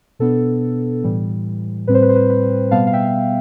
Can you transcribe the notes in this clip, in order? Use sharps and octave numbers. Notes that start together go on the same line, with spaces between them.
B2 B3 D4 A4
A2 E3 G3
A2 G3 C4 B4
C5
B4
C5
B4
B4
B2 G3 B3 F5 A5
F5
E5 G5